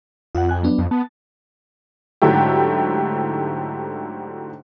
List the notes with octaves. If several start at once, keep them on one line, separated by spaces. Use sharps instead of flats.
F2 F4 F#5
G5 G#5 F#6
F#3 B3 D4
F2
B3 A5
G#2 D3 F#3 A3 E4 G4